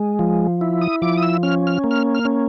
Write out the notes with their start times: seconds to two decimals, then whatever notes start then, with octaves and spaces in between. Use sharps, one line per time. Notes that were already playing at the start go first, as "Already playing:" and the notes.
Already playing: G#3
0.19 F3
0.61 E4
0.81 D#6
1.02 F3 D6
1.17 D#6
1.23 E6
1.43 C#4 F6
1.67 F6
1.84 A#3
1.91 F6
2.15 F6
2.25 C#4